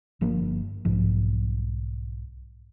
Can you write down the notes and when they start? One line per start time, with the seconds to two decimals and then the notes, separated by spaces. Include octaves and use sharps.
0.21 G1 F3 A#3 D4
0.85 B1 G#2 F3